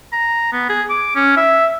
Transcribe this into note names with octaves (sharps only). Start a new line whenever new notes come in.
A#5
B3
G#4
D6
C#4
E5